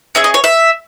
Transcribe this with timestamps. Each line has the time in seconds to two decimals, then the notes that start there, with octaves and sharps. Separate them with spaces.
0.15 C#4 G#4 E5
0.24 D#5
0.34 C#5
0.44 E5